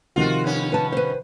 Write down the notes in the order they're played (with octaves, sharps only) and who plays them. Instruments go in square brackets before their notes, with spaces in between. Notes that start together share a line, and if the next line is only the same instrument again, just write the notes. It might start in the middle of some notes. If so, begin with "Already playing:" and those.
[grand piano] C3 D#3 F3 [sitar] F4 F#4
[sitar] G2 B3 C#4
[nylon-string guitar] B4 A5
B4 C5